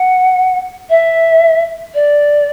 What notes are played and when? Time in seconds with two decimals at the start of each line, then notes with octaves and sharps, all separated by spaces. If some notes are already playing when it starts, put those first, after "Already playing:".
Already playing: F#5
0.90 E5
1.95 D5